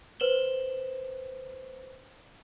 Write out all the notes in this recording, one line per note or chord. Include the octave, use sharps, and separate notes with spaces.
B4 C5 E7 F#7 G7